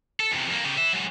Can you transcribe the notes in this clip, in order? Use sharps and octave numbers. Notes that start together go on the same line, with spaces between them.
A4
E2 C3
F2 A#3
C#3 G4
B4 E5
F#3 G#3